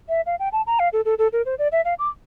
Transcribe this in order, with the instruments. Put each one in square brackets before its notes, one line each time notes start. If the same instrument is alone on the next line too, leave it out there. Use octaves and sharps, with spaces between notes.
[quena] E5
F5
G5
A5
A#5
F5
A4
A4
A4
A#4
C5
D5
E5
F5
D6